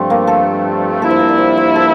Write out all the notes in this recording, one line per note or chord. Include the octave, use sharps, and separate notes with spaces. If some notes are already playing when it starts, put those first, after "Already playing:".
Already playing: G2 F3 A3 C4
A#3
A4
G2 F3 A#3 E4 A4
C5
A#4
D5
C5
C5
A4